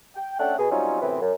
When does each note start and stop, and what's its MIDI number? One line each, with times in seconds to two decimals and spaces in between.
0.16 0.36 79
0.40 0.54 57
0.40 0.54 61
0.40 0.54 62
0.40 0.54 69
0.40 0.54 78
0.40 0.54 79
0.59 0.70 47
0.59 0.70 68
0.71 0.99 54
0.71 0.99 55
0.71 0.99 60
0.71 0.99 61
0.71 0.99 63
0.71 0.99 65
1.01 1.20 42
1.01 1.20 45
1.01 1.20 48
1.01 1.20 52
1.01 1.20 59
1.01 1.20 60
1.22 1.32 42